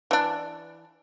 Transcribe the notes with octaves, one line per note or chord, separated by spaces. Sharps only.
E3 D4